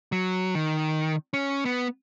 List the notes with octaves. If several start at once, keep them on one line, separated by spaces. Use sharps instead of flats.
F#3
D#3
C#4
B3